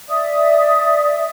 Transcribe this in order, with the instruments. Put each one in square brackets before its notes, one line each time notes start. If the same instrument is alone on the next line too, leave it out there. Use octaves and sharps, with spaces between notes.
[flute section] D5 E5 D#6